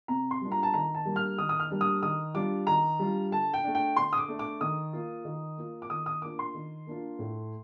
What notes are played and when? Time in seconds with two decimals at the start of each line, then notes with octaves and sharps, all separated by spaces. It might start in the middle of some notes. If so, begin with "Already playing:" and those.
0.08 C3 A#5
0.31 C6
0.41 G3 A#3 D4 F4
0.52 A#5
0.63 A5
0.74 D#3 A#5
0.95 A5
1.05 G3 A#3 D4
1.16 F6
1.38 D#3 D#6
1.49 D#6
1.60 F6
1.70 G3 A#3 D4
1.81 D#6
2.03 D#3 D#6
2.35 G3 D4 F4 D6
2.67 D#3 A#5
2.99 G3 D4 F4
3.31 D3 A5
3.54 G5
3.64 A3 D4
3.75 G5
3.96 D3 C6
4.13 D#6
4.18 D6
4.28 A3 D4
4.39 D6
4.61 D#3 D#6
4.93 A#3 F4
5.25 D#3
5.58 A#3 F4
5.82 D6
5.90 D#3 D#6
6.06 D#6
6.22 A#3 D4 F4 D6
6.39 C6
6.55 D#3
6.87 A#3 D4 F4
7.19 A2